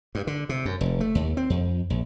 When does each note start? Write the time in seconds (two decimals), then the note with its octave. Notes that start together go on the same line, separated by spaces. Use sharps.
0.15 G2
0.27 D3
0.49 C3
0.65 F#2
0.81 F1
1.00 A3
1.15 D#2
1.37 C4
1.50 F2
1.90 A#1